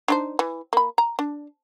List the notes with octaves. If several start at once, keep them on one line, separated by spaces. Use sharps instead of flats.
D4 D#4 C5
E3
A#3 B5
A#5
D4